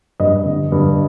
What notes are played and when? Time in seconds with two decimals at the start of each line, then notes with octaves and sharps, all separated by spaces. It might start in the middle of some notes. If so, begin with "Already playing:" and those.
0.20 G2 D#5
0.45 D3
0.72 G2